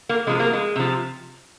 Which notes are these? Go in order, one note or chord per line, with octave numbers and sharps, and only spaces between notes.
A#3
C3 F3 G#3
A#3
G#3
C3 F3